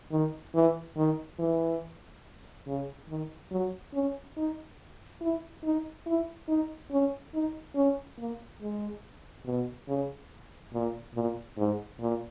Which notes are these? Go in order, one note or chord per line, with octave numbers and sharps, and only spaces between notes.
D#3
E3
D#3
E3
C#3
D#3
F#3
C#4
D#4
E4
D#4
E4
D#4
C#4
D#4
C#4
A#3
G#3
B2
C#3
A#2
A#2
G#2
A#2